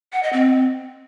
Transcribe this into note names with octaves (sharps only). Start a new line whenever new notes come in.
F#5
D#5
C4